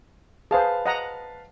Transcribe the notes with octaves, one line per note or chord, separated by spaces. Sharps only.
G#4 B4 C5 F5 A5
D#5 F#5 A#5